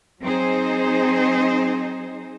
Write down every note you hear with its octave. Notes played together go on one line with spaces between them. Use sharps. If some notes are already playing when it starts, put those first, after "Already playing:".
F#3 C4 D#4 G#4 C5